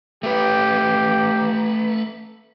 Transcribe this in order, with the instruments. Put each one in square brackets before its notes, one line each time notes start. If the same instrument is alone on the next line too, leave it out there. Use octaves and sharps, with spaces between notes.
[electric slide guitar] A3 B4 [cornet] G4